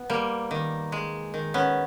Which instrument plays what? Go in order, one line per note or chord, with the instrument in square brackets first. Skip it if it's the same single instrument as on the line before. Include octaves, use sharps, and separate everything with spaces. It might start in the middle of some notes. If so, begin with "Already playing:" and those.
Already playing: [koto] B3
G3 A#3
D#3
G#3
D#3
B3 C#4